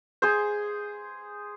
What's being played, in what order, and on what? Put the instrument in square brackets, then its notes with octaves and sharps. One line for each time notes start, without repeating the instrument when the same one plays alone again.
[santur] G#4 C5